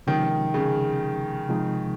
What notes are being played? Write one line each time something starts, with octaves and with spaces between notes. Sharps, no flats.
C3 D#3 F3 G#3 C#4 G4
C#3
C3 F3 G#3 D#4